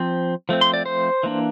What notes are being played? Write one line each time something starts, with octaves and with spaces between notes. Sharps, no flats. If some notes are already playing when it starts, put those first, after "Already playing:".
Already playing: F3 C4
F3 A3 C4
C6
D5
C5
E3 A#3 D4